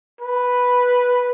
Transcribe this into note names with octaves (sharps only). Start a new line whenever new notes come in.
B4